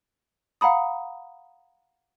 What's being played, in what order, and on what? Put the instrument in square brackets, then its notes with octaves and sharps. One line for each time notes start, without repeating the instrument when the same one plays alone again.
[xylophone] F5 F#5 A#5 B5 D#6